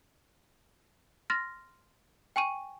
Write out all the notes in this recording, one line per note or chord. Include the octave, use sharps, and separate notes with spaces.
C6 F6 A6 A#6
G5 G#5 C#6 D#7